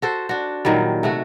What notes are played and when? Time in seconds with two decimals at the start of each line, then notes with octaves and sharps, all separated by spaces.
0.02 F#4 A4 C5
0.29 D4 F#4
0.65 A#2 D#3 F#3 G3
1.03 C3 A3 F#4